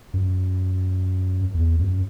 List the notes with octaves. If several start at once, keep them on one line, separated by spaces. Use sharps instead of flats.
F#2
E2
F#2